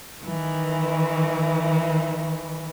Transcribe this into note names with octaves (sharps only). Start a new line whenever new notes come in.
D#3 E3